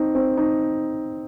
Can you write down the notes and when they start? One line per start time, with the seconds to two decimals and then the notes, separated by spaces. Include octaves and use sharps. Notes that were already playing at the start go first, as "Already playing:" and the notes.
Already playing: C4 D#4
0.15 C4
0.37 D#4